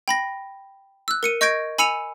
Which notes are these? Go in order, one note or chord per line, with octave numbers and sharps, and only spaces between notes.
G5 B5 A#6
E6 F#6
A#4 C#7 D#7
D#5 C#6 G6 G#6 A#6 D7
G#5 B5 E6 C#7 D#7 F7